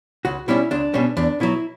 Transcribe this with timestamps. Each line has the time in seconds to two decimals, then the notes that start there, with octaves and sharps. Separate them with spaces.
0.25 C#2 F#4
0.48 B2 G3 C#4 E4
0.71 C#2 D4
0.94 B2 G3 C#4
1.17 E2 D4
1.40 B2 F#3 E4